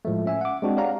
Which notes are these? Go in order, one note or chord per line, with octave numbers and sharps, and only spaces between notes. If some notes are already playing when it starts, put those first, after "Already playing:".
A2 F3 G#3 A3
C#4 E5 G#5
F#5 D6
G#3 C4 D4 F#4
G4 C#5 D5 F5 F#5 A#5